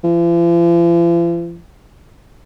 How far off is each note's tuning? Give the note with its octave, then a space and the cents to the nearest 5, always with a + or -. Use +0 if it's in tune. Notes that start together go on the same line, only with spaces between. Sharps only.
F3 -45